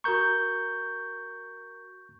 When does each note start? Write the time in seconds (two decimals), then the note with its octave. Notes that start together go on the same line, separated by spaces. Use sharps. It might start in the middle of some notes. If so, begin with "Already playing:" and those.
0.04 F#4 A#4 A#5 C#6 G6